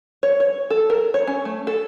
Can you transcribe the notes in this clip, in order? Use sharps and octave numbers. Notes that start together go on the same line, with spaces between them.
C#5
C#5
A4
A#4
C#5
C#4
A3
A4